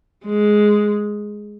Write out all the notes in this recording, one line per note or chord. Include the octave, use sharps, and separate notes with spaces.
G#3